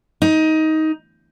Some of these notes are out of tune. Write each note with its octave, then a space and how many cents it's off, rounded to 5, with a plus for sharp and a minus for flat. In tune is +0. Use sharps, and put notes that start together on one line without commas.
D#4 +15